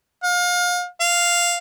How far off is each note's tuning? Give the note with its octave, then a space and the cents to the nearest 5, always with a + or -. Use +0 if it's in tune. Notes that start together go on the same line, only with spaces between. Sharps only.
F5 +35
F5 +0